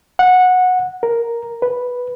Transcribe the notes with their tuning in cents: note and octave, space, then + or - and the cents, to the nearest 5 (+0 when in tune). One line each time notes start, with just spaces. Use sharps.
F#5 -15
A#4 +5
B4 -5